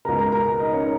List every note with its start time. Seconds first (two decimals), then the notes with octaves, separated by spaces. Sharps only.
0.05 C#2 B2 A#4 A#5
0.18 A#4 A#5
0.32 A#4 A#5
0.60 D#4 D#5
0.73 C#4 C#5